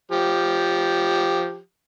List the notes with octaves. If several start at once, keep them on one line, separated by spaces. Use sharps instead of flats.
F3 G4